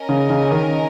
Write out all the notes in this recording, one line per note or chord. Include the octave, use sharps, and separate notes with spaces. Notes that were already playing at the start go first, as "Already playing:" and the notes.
Already playing: C#4 A#4 D#5
C#3
C#3
D#3